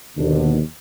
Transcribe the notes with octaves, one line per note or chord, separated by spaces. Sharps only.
D#2 B2 D3